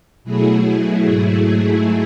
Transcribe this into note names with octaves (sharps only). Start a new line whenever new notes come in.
B2 F#3 A3 E4 G#4
G#2 F#3 A3